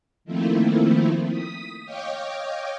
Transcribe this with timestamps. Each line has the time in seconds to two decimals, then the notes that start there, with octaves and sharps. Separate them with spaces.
0.25 D#3 F3 A3 A#3 C4 E4
1.30 D#6 B6
1.85 C#5 D#5 F5 G5 D6